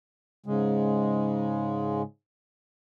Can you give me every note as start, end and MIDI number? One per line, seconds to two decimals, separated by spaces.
0.46 2.02 44
0.46 2.02 49
0.46 2.02 56